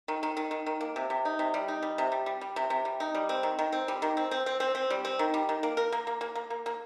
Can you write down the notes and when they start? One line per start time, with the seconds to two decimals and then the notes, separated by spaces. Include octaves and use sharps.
0.08 D#3
0.23 D#3
0.37 D#3
0.51 D#3
0.66 D#3
0.81 A#3
0.96 C3
1.10 C3
1.25 D#4
1.39 C3
1.54 G3
1.68 D#4
1.82 G3
1.98 C3
2.12 G3
2.26 G3
2.41 G3
2.56 C3
2.70 C3
2.85 G3
3.00 D#4
3.15 G3
3.29 C4
3.43 D#3
3.59 D#3
3.72 C4
3.88 G3
4.02 D#3
4.17 C4
4.31 C4
4.46 C4
4.60 C4
4.75 C4
4.90 G3
5.05 C4
5.19 D#3
5.34 G3
5.49 D#3
5.63 A#3
5.77 A#4
5.92 A#3
6.07 A#3
6.21 A#3
6.35 A#3
6.50 A#3
6.66 A#3